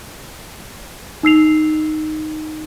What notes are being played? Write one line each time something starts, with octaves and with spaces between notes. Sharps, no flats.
D#4 E6 C7 F7